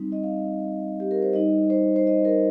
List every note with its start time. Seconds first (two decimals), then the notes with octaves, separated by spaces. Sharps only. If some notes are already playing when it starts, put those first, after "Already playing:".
Already playing: G3 C4 D#4
0.12 D#5
0.23 F5
1.00 G4
1.11 A#4
1.22 C5
1.33 G3 D#4 D#5
1.70 C5
1.96 C5
2.07 D#5
2.25 A#4